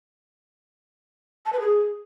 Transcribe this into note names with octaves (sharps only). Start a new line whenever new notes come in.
A5
B4
G#4